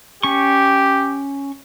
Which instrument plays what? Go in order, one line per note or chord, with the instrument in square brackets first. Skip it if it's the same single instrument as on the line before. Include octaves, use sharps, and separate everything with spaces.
[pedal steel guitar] C#4 C#6 [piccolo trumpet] G4